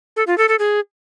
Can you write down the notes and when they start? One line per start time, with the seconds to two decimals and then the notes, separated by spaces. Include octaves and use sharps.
0.16 A4
0.27 F4
0.38 A4
0.48 A4
0.59 G#4